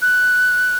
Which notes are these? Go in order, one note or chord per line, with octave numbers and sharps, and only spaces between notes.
F#6